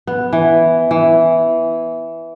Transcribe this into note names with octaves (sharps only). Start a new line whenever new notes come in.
B3
E3
E3